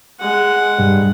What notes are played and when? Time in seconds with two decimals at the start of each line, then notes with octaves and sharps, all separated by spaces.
0.19 G#3 F#5
0.79 G2